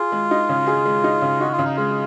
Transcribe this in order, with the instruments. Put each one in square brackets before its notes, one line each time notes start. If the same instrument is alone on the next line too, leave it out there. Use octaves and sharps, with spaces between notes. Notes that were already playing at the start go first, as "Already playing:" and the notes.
Already playing: [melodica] F4 [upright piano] G#4
[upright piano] G#3
D#4
C#3
G#4
G#3
D#4
C#3
[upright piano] D#4 [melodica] F#4
[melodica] F4
[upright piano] C#3
[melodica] D#4
[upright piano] G#3 [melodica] F4